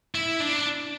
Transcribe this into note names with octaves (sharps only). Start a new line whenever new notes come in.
E4
D4